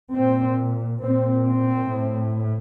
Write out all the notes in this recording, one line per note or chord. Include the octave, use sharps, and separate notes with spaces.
A#2 C4
A#2 C4
C4
A2